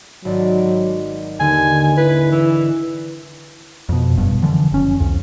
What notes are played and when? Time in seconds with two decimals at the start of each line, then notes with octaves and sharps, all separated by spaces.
0.25 G#1 F#3 D5
1.40 D#2 D3 G#5
1.97 E4 B4
2.31 E3
3.89 F2 B2
4.17 F#1 G2 B2
4.43 D3 E3 F3
4.72 F#1 C#4
5.00 C2 F2